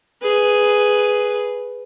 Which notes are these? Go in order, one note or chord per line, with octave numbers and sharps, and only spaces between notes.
G#4 B4